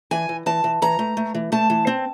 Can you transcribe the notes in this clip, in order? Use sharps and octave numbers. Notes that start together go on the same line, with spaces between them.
E3 G#5
E3
E3 A5
E3
E3 A#5
A3
A3
E3
A3 A5
E3
C4